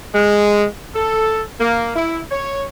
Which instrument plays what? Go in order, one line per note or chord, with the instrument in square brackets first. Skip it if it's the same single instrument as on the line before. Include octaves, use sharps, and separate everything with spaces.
[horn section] G#3
A4
A#3
E4
C#5